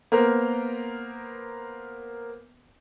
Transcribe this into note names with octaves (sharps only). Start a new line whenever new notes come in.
A#3 B3 A#4 C5